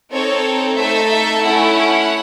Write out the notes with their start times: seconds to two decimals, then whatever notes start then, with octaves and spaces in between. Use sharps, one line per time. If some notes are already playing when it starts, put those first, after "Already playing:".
0.11 C4 D#4 A4 C#5
0.77 A3 D#4 A4 E5
1.10 E5
1.43 A3 C#4 E4 F#5